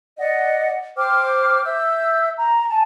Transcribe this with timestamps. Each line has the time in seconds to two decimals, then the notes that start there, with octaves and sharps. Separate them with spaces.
0.18 D5 D#5 F#5
0.97 C5 G5 D6 F6
1.64 E5 E6 G6
2.37 A#5
2.70 G#5 A5